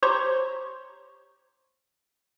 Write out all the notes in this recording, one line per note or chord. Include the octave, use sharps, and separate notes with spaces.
G4 C5 C#5 A#5 C6 C#6